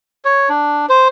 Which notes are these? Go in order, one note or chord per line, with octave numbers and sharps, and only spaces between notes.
C#5
D4
C5